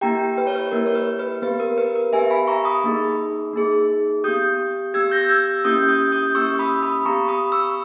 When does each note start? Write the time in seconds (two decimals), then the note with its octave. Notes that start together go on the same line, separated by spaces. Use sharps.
0.01 A#3 E4 G4 G5 A#5
0.38 B4
0.47 C#5
0.55 B4
0.72 A#3 E4 G4 A#4
0.86 C#5
0.95 B4
1.19 B4
1.42 B3 B4
1.45 G4
1.60 A#4
1.78 B4
1.95 A#4
2.13 B3 G4 E5 G#5
2.30 G#5 B5
2.48 A#5 C#6
2.65 B5 D#6
2.84 A#3 D#4 G#4
3.53 A#3 D#4 G#4
4.24 B3 G4 D#6 G6
4.94 B3 G4 E6 G#6
5.11 G6 A#6
5.29 E6 G#6
5.64 A#3 C#4 E4 G4 D#6 G6
5.88 D#6 G6
6.12 D#6 G6
6.35 A#3 C#4 E4 G4 C#6 E6
6.59 B5 D#6
6.83 B5 D#6
7.05 B3 A#5 C#6
7.09 G4
7.28 B5 D#6
7.52 C#6 E6